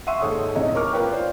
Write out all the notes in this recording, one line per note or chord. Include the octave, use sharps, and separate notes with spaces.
E5 F#5 C6 C#6 E6 D#7
D#2 G#2 G#3 A4 C#5 D#6
D#1 E2 C#4 C#5 D#5
A#4 C#6 D6 F6
A#3 F4 A#4 B4 C#5 G5
F4 C5 D5